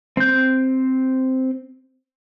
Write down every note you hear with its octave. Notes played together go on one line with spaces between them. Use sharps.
C4 G6